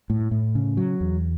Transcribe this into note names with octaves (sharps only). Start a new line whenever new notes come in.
A2
A2
C#3
F#3
E2